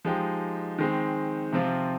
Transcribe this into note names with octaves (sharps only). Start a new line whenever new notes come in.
F3 G#3 D#4 G4
D#3 G#3 C4
C3 F3 C4 F4